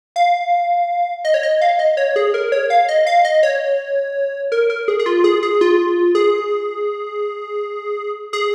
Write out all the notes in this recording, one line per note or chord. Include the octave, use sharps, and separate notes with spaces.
F5
D#5
C#5
D#5
F5
D#5
C#5
G#4
A#4
C#5
F5
D#5
F5
D#5
C#5
A#4
A#4
G#4
G#4
F4
G#4
G#4
F4
G#4
G#4